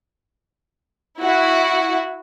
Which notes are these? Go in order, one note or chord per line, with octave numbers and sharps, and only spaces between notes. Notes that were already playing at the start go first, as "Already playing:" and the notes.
E4 F#4